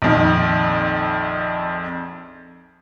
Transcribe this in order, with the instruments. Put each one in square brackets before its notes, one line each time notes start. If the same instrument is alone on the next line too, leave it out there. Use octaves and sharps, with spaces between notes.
[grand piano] A#1 F2 D#3